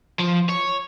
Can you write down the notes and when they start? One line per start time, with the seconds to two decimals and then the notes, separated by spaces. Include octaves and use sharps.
0.19 F3
0.49 C#5